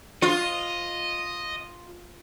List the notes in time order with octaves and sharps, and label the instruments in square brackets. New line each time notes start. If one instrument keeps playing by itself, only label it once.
[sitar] F4 [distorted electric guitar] D#5